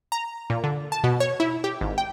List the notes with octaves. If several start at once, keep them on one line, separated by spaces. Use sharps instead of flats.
A#5
A#2
D3
A5
B2
C#5
E4
G4
G#1
G5